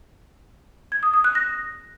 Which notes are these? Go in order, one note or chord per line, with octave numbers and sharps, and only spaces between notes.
G#6
D#6
D#6
F#6
A#6